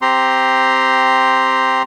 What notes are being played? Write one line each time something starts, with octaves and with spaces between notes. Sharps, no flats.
C4 G4 A#5 C6